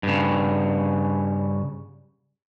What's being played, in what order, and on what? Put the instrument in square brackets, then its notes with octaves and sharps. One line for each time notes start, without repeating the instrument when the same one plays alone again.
[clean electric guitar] G2 C#3